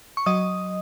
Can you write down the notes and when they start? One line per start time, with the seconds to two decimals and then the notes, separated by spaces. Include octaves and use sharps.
0.17 C#6
0.26 F#3 D#5 D#6